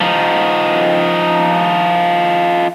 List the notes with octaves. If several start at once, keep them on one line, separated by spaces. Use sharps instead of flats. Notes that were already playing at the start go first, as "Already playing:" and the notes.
F3 D#4